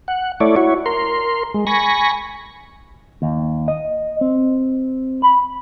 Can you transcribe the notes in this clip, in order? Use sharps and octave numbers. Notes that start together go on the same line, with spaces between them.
F#5
A3 E4 C#5 D5
E4 F#4 C#5
A#4 C6
G#3
G#5 B5 C#6 A#6
D#2
D#5
C4
B5